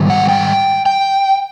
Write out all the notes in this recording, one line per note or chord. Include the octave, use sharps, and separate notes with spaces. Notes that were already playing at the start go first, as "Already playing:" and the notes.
Already playing: G#2 D#3 G3
F#5
G5
G5